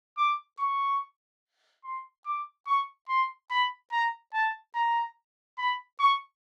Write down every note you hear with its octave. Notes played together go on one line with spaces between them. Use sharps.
D6
C#6
C6
D6
C#6
C6
B5
A#5
A5
A#5
B5
C#6